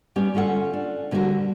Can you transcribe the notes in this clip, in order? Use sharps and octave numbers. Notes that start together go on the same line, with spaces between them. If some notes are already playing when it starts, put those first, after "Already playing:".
G3 B3 C#4 G4
D3 C#4 F4 A4 F#5
D4
F2 D3 G3 E4 F#4 A#4